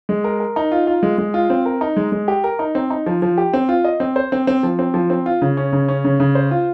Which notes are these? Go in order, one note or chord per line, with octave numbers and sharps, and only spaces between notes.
G#3
A#4
A#4
D#4
F4
F4
G#3
G#3
F4
C4
A#4
D#4
G#3
G#3
G4
A#4
D#4
C4
D#4
F3
F3
G4
C4
F4
D#5
C4
C5
C4
C4
F3
C4
F3
C4
F4
C#3
C#4
C#3
C#4
C#3
C#3
C5
F4